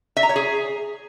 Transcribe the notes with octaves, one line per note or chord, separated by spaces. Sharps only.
E5
A#5
C#5
G#4